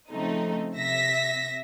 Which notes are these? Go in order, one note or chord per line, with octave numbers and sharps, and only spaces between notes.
C#3 F3 A3 C4 D#4
C3 E5 A#6 B6